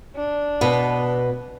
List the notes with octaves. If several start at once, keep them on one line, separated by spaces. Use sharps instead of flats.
D4
B2 B3